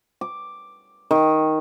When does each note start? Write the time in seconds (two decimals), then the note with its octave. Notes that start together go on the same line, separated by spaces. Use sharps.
0.21 D6
1.11 D#3